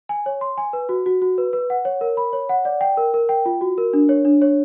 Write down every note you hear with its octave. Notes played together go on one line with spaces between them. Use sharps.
G#5
C#5
C6
G#5
B4
F#4
F#4
F#4
B4
B4
F#5
C#5
A#4
B5
C#5
F#5
D5
G5
A#4
A#4
G5
F4
F#4
A#4
D4
C#5
D4
C#5